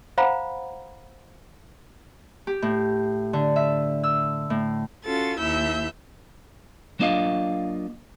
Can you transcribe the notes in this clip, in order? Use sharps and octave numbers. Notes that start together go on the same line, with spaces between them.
C5 F5 F#5 A#5 B5
G4
A2
D3
E5
E6
A2
C#4 F4 F#4 A4 A6
D#2 E4 E5 E6 G6
F#3 A#3 D4 F4 D#5 F5